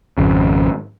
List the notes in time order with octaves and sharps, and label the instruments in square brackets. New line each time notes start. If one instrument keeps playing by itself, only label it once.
[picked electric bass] G#1 F2 C#3